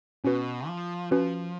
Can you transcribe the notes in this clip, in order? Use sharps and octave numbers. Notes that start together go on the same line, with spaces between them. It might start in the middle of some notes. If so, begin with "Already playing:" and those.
B2 C#4 F#4 B4
F3
F3 C#4 F#4 B4